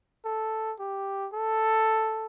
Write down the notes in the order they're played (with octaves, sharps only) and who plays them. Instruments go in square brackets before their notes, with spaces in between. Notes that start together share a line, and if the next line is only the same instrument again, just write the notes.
[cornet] A4
G4
A4